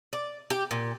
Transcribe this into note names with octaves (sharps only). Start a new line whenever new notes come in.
D5
G4
A#2